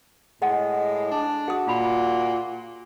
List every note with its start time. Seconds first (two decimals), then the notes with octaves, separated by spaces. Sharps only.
0.42 A2 G#3 D#5 F#5
1.11 D4
1.48 F#4 G#4 D#6
1.67 A#2 F4 B5